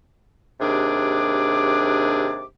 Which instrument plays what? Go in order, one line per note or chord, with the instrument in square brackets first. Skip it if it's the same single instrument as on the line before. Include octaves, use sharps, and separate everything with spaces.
[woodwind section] D#2 C3 D4 G#4 D6